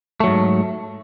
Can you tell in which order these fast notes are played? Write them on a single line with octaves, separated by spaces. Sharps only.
A3 F#3 G#2